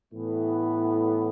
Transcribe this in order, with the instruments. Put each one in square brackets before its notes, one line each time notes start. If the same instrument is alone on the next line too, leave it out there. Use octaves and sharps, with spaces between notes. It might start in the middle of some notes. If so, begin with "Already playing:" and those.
[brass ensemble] A2 E3 B3